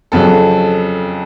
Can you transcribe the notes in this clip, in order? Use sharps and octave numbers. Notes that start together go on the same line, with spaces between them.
F2 C#3 F#3 A4